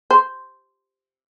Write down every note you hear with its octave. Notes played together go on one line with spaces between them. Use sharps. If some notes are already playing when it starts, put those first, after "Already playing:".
C5